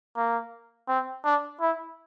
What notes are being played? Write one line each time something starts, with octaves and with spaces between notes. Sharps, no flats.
A#3
C4
D4
E4